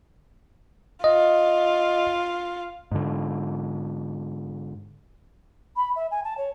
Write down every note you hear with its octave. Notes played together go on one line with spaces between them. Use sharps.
F4 D#5
G#2 D3
B5
E5
G#5
A5
C#5